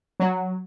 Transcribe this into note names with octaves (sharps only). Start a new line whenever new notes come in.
F#3